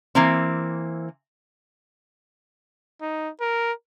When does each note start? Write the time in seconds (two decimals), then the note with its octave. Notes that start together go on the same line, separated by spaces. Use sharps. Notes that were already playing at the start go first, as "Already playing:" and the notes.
0.15 E3 A#3 C4
3.02 D#4
3.41 A#4